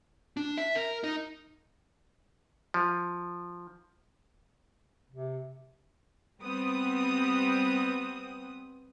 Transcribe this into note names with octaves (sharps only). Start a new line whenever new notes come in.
D4
E5
A#4
D#4
F3
C3
G3 B3 C4 D#6